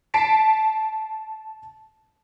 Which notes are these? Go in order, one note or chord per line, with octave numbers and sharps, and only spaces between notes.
A5 A6 B6 C7 D7